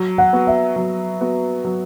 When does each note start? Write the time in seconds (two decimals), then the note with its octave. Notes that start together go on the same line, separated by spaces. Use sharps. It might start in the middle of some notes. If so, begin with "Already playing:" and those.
Already playing: F#3
0.18 F#5
0.33 B3 F#4
0.47 E5
0.76 F#3
1.21 B3 F#4
1.65 F#3